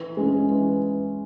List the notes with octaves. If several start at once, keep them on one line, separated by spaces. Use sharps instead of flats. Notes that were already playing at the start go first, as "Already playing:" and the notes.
Already playing: E3
G#3 C#4
E3